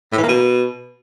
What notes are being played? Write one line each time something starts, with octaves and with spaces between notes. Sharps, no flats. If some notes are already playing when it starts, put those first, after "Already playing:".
A2
E3
A#3
B2